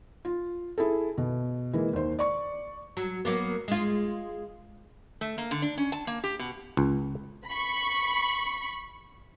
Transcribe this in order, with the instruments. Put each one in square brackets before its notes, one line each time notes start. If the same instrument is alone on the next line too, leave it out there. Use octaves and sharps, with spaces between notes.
[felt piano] F4
E4 G#4 A4
B2
E3 G#3 A#3
D#2 C5
D5 C#6
[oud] F#3
F#3 A#3 B3
G#3 F4
[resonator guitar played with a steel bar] A3
A#3
D3
D4
C#4
A5
A#3
G4
B2
[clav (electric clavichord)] C#2
[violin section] B5 C#6